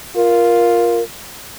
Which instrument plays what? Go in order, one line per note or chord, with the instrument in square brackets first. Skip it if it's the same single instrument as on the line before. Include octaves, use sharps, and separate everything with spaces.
[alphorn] F4 [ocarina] A#4